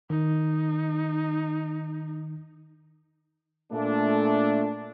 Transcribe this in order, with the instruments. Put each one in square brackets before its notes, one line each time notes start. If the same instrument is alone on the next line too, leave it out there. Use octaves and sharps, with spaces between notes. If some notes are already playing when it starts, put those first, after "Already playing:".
[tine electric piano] D#3 [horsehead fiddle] D#4
[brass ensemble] A#2 A3 D4